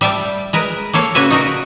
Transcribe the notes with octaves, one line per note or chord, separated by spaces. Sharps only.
G3 E5 G5 A5
G#3 A#4 B4
A#3 A4 C#5 F5
C#3 A#3 F#4 B4 E5 G#5
D#4 F#4 A#4